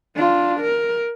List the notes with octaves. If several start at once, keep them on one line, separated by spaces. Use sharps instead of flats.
D4 F4
A#4